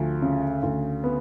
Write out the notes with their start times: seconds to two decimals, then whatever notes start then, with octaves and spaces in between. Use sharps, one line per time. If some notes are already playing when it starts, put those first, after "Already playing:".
Already playing: D2 F3
0.22 C#3
0.63 D2
1.04 B3